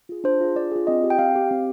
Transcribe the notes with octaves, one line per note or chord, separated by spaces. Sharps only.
F4 G#4
D4 C5
F4 G#4
D4 D5
F4 G#4
C4 D#5
G4
G5
C4 F5
G4
C4